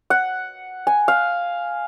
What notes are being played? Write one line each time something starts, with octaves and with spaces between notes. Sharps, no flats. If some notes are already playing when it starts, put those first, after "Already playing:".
F#5
G#5
F5